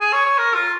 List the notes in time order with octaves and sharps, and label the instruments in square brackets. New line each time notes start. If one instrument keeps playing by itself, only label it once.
[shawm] G#4
C#5
C#5
A#4
F4